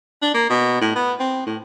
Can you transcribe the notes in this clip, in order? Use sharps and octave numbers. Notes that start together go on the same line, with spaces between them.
D4
A#3
B2
A2
B3
C4
A2